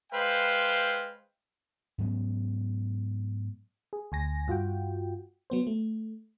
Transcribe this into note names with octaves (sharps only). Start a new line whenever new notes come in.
G#3 B4 C5 F5 G5
G#2 F#3 B3 C#4
G#4
D2 G#5 A#6
G2 F4 F#4 G5
F#3 B3 C5
A3